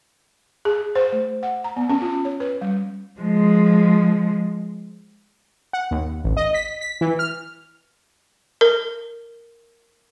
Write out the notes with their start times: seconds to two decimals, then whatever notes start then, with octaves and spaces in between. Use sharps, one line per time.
0.65 G#4
0.95 C5
1.12 A3
1.43 F#5
1.64 A#5
1.76 B3
1.90 C#4
2.02 F4
2.25 C#5
2.40 B4
2.61 G3
3.21 F3 G#3
5.73 F#5
5.91 D#2
6.24 A1
6.37 D#5
6.54 B6
6.81 B6
7.01 E3
7.19 F6
8.61 A#4